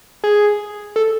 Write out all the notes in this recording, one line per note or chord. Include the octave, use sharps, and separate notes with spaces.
G#4
A4